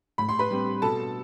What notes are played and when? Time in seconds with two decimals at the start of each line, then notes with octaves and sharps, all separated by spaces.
0.18 A2 B5
0.29 C6
0.39 B4 B5
0.51 G3 C4
0.82 B2 A4 A5